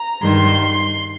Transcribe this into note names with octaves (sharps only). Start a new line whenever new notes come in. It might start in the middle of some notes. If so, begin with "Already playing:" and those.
Already playing: A#5
G2 D#3 C6